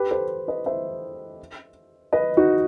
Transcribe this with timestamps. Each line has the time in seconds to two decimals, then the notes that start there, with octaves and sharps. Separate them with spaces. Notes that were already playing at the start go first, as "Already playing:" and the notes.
Already playing: G4 B4
0.11 A4 C5
0.48 B4 D#5
0.66 C5 E5
2.13 B4 D#5
2.37 D#4 F#4